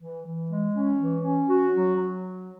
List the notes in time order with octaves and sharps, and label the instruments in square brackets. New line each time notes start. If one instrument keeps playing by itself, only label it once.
[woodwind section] E3
E3
G#3
C#4
E3
C#4
F#4
F#3
F#3